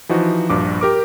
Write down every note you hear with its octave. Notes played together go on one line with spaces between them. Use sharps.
E3 F3 D#4 F#4
A#1 G2 D6
G4 A#4 D6